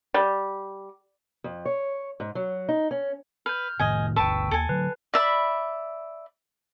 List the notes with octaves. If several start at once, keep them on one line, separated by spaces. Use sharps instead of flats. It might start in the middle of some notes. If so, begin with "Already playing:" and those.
G3
F2
C#5
G#2
F#3
D#4
C#4
B4 F6 G6
F1 A2 D#3 D#5 G#5
G1 D2 B4 G5 A5 C#6 E6
D#2 A4 G#5
D3 F#3 B4
D5 E5 B5